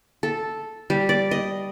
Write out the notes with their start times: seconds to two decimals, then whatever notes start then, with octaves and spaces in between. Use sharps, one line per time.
0.23 A4
0.90 G3
1.09 D5
1.31 D#5